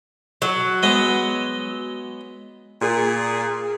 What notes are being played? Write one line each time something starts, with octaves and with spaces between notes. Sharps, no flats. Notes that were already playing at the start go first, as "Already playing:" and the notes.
F#3
G#3 B3 D#5
A#2 G#4